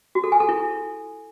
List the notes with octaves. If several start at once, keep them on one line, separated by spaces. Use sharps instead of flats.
F#4
A4
G#5
A4
E4